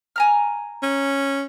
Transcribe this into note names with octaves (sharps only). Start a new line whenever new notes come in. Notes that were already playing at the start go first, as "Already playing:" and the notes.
G#5 A#5 F6
C#4